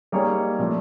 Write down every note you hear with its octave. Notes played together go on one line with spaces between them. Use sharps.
G3 A#3 D#4 G#4 C#5
A#2 F3 A3